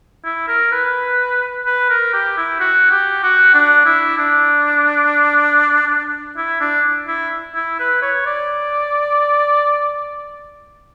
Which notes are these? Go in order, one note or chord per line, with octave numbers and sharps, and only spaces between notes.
E4
A#4
B4
B4
A#4
G4
E4
F#4
G4
F#4
D4
E4
D4
E4
D4
E4
E4
B4
C#5
D5